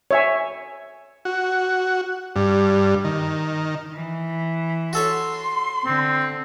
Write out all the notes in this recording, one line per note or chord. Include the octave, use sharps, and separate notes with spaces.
C#5 E5 G#5
F#4
G2
D#3
E3
F#4 A4 C#5 C6
D3 C4